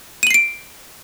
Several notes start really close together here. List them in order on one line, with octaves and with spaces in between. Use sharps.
D#7 F#7 C7 D7